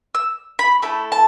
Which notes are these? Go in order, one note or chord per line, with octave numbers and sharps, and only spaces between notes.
E6
B5
A3 E4 A4 B5
A5